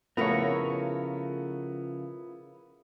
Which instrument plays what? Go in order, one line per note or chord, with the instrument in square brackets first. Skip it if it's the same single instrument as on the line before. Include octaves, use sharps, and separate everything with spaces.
[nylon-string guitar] C#3 F3 A3 [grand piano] B3 E4 [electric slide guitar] A#4 C#5